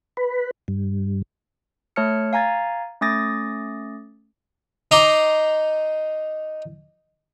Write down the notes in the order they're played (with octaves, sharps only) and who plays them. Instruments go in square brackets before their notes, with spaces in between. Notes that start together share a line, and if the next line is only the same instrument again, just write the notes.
[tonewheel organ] B4
G2
[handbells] A3 C#5 A5 F6 C#7
F5 G#5 A#5 G#6 A6
A3 C#4 D6 D#6 A6 A#6
[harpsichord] D#4 A#5 C6 D6